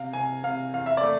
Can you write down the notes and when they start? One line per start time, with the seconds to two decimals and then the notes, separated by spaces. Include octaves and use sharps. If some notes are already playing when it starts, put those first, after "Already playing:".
Already playing: C3 F5
0.13 C3 G#5
0.43 C3 F5
0.73 E2 F5
0.86 E5
0.97 D5
1.03 A3